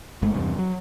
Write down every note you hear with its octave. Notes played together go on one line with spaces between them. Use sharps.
G1 G2 G#3 A3
E2 G2 C3
F#3